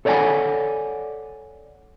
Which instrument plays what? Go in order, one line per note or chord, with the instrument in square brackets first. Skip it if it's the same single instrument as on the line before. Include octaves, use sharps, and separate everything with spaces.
[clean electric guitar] A4 C#5 D5 E5 F#5 G#5